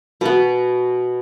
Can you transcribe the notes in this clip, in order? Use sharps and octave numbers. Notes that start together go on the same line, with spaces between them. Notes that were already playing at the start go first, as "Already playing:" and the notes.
B2 B3